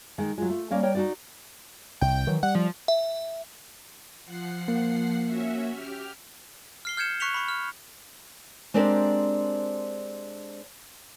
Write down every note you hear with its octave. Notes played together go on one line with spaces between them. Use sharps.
D#3 G#3
F#3 G#3 F4
A3
G3 A#3 C#4 F5
A#4 C#5 G5
D#4 F#4 D5
C2 G5
D#3 E3 F#3
G3 F#5
F3
E5
F3 F#5 C7
A#3
C#4 F#4 E5
G4 F6
F6 C7 G7
F6 G6 G#6 C#7 E7
C#6 F#6 B6 C#7 F7 G7
B5 C#6
F6
G#3 C4 D4 G4 A#4